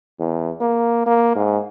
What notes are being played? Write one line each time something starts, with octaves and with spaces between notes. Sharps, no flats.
E2
A#3
A#3
G#2